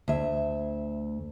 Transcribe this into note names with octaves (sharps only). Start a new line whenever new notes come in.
D2 E5